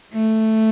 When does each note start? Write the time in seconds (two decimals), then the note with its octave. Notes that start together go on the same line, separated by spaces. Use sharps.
0.14 A3